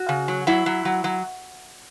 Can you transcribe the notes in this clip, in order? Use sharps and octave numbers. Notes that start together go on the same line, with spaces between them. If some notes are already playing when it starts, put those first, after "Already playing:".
Already playing: F#4
C#3
F#3
F#3 E4
F#3
F#3
F#3